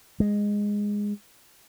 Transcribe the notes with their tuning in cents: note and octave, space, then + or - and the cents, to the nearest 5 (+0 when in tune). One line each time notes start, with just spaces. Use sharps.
G#3 -10